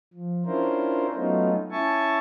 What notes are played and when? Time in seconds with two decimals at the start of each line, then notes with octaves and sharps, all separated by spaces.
0.13 F3
0.46 C#4 D4 E4 F4 A#4 C5
1.15 F#3 A3 B3 C#4 D#4 F4
1.71 C#4 E4 E5 G#5 A5 C#6